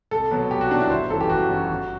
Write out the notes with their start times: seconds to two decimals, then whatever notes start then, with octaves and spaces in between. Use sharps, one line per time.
0.11 C2 A4
0.31 B2 F#3
0.51 C2 G4
0.61 F#4
0.71 B2 F#3 D4
0.80 E4
0.90 G1 C5
1.10 F#2 E3 A4
1.21 G4
1.30 G1 F#4
1.50 F#2 E3
1.69 G1